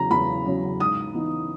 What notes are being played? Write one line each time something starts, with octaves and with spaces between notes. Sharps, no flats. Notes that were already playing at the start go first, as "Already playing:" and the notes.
Already playing: E2 C#3 F#3 C#4 A#5
E2 B5
C#3 F#3 C#4
G#2 D#6
E3 B3 D#4